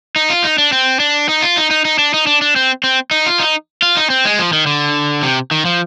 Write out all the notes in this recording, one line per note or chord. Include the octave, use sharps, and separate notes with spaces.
D#4
F4
D#4
D4
C4
D4
D#4
F4
D#4
D#4
D#4
D4
D#4
D4
D4
C4
C4
D#4
F4
D#4
F4
D#4
C4
G#3
F3
D#3
D3
C3
D#3
F3